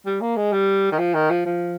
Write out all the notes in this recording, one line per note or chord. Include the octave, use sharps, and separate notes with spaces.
G3
A#3
G#3
G3
D#3
F3
D#3
F3
F3